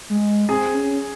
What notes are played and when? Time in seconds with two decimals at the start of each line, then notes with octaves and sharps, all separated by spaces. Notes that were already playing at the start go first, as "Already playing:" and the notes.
0.10 G#3
0.49 C4 G#4
0.74 C#4